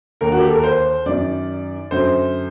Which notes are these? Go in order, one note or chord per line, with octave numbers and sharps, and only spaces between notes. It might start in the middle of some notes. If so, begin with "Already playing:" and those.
D#2 D3 A#4
F#4
G4
A4
A#4
C5
F#2 D#3 D5
F#2 D3 C5